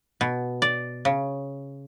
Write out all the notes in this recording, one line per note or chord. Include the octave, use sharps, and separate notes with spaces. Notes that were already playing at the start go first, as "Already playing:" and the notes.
B2
D5
C#3